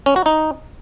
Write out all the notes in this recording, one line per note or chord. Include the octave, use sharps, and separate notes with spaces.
C#4
F#4
D#4